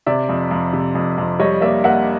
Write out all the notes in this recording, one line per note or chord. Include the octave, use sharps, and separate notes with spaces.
C3 D5 E5
F2
F2
C3
F2
F2
G3 C#5 D#5
A#3 D5 E5
A#3 E5 F#5